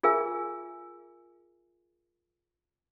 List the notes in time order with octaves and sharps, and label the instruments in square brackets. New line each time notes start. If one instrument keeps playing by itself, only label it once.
[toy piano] F4 G#4 A#4 E5 G#5